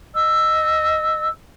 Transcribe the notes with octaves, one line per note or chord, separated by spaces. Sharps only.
D#5 E6